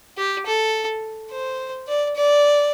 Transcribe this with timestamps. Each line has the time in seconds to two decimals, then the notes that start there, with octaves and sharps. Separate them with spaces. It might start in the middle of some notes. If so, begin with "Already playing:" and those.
0.18 G4
0.46 A4
1.31 C5
1.87 D5
2.16 D5